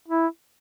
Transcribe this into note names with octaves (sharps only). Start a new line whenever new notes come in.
E4